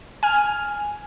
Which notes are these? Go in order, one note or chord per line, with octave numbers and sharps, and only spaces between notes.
G#5 F6